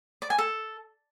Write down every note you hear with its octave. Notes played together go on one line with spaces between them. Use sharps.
D5
G#5
A4